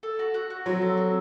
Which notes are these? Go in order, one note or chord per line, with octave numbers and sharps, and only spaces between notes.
A4
F#4
F#4
F#4
F#3 C4
A4
C4